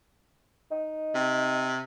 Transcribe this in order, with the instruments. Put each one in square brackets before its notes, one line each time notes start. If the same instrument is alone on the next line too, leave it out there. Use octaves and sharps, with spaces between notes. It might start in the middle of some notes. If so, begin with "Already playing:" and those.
[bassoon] D#4
[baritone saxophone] C3